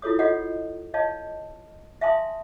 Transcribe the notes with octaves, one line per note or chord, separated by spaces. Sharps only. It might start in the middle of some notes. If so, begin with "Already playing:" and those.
E4 F4 A4 C#5 D#6
F4 F#4 A4 C#5 D#5 F#5
C#5 D#5 F5 A5
E5 F5 G#5 A5 C6 D#6